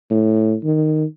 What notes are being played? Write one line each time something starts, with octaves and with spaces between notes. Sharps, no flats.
A2
D#3